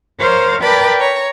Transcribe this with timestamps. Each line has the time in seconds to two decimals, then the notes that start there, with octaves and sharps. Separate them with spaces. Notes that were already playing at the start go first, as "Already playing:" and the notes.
0.21 A#4 C5 C#5 F5
0.62 A#4 B4 D5 G5 A5 B5
0.99 C#5 A#5